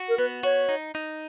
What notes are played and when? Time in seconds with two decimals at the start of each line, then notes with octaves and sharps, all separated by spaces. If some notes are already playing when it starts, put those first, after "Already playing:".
Already playing: F#4
0.09 A#4
0.18 B3 B4
0.43 F#4 C#5
0.69 D#4
0.95 D#4